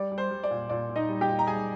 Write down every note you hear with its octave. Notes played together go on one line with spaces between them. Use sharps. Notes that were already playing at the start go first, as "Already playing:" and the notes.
Already playing: G3 D5
G3
C5
G3
D5
A#2
A#2 D5
A#2
D#4 D#5
G3
G4 G5
A#2
A#5
G3 G#4 G#5